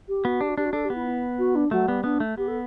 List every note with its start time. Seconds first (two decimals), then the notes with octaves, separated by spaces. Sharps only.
0.08 G4
0.25 B3 F#4
0.40 D4 G4
0.49 F#4
0.57 D4 G4
0.65 F#4
0.73 D4 A4
0.84 G4
0.90 B3
0.95 E4
1.06 E4
1.38 F#4
1.55 D4
1.71 F#3 A3
1.88 G3 B3
2.04 B3 D4
2.20 A3
2.37 B3 G4
2.47 A4